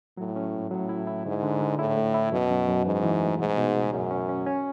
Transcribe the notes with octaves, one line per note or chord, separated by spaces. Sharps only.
A2 F#3
C#4
G#2
A2 F#3
E4
E4
G#2 D3
D3
D3
A2 E4
A3
E4
F#2 B2
F#2
F#2
G#2 E3
E3
A3
G#2 B2
B2
C#2
F#2 C#4
C#4
C#4
C#4